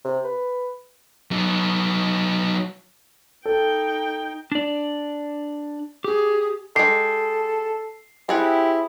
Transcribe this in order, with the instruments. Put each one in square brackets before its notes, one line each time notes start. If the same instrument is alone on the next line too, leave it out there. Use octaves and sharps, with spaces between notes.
[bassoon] C3
B4
[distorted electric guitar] F#3 D#4
[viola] D#4 G5 [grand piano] A4
[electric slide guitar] D4 D5
[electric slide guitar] G4 [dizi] G#4
[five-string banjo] G#3 G4 [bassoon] A4 [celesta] C7
[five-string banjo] C4 G#4 F#5 [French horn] E4 [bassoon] G4